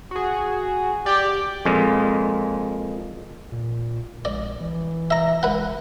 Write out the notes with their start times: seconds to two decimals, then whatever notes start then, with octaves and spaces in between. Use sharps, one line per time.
0.11 F#4 G#4
1.06 G4 D5
1.65 F2 A#2 G#3
3.52 A#2
4.25 A#1 D5
4.60 E3
5.11 E5 A#5
5.43 F#1 B4 F#5